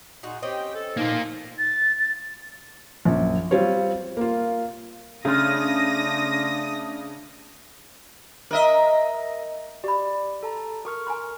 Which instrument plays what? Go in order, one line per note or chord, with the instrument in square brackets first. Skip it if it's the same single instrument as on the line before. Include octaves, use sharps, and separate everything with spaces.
[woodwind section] A#2 [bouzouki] D#4 F#4 G#4
[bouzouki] C4 C#4 D#5 [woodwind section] G4 G5
[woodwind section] A4
[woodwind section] C3 F3 [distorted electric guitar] A#3 F4 [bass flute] D#4
[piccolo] A6
A6
[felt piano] A#1 F#2
G3 C4 F4 C#5
A#3 F4
[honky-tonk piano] C#3 [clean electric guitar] A3 F4 [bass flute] D4 [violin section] D#6 A#6
[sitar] A#4 D#5 E5
[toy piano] G4 B5 [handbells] D5
[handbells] A4 A5 A#5
[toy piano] A4 [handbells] A#4 C#6 F6
[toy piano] G#5 A#5 C6